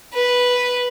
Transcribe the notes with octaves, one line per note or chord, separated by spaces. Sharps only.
B4